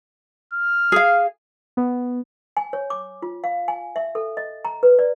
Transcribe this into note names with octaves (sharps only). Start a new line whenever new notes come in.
F6
G#4 F5
B3
G#5
C#5
D6
F4
F5
G#5
E5
A4
D#5
A#5
B4
D5